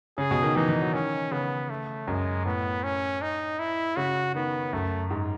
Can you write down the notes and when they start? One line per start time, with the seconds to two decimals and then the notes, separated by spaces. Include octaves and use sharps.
0.18 C#3 G#4
0.31 B2
0.43 D#3
0.56 E3 D#4
0.69 E3
0.81 F#3
0.93 D#3 C#4
1.31 C#3 B3
1.70 A3
2.07 F#2 G#3
2.45 A2 B3
2.84 C#4
3.22 D#4
3.59 E4
3.96 C#3 F#4
4.34 D#3 B3
4.73 F#2 A3
5.10 G#2